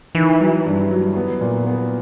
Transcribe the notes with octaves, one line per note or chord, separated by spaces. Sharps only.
D#3 E3
F#3
G2
F#3
B3
A#2
B3